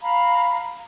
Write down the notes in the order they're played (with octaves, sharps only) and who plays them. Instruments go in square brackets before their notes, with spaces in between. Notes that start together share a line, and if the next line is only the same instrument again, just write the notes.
[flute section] F5 A#5 B5